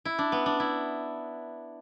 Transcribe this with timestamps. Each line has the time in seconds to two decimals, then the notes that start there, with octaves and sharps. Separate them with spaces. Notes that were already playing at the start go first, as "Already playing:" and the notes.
0.05 E4
0.19 D4
0.32 B3
0.46 D4
0.60 E4